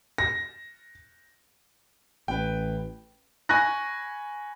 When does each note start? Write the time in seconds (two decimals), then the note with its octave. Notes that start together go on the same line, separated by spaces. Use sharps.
0.18 A#6
2.28 A1 B4 G5
3.49 G#5 B5 C#6 F#6 A#6